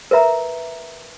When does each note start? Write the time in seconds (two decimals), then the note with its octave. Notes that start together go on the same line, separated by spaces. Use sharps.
0.11 A#4 B4 E5 A#5